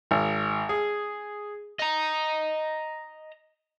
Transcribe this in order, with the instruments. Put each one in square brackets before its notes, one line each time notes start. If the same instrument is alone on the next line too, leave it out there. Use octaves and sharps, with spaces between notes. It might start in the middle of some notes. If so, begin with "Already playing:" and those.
[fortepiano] G#1
G#4
[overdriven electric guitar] D#5 A#5